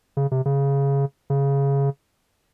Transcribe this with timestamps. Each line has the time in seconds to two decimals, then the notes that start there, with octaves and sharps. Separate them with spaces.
0.17 C#3
0.31 C3
0.46 C#3
1.30 C#3